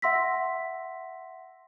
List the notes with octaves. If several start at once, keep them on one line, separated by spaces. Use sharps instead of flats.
E5 F#5 C6 E6 A#6 B6